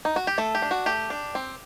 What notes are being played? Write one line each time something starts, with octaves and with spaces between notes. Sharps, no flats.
D#4
F#4
G4
A3 A4
G4
D4
F#4
A3 G4
D4
C4